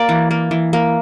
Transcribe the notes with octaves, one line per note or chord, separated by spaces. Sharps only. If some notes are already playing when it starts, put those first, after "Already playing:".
Already playing: A#3 D5
E3
A#3
E3
A#3